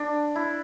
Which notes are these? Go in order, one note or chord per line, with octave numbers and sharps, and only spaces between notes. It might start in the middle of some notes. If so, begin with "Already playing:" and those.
Already playing: D4
E4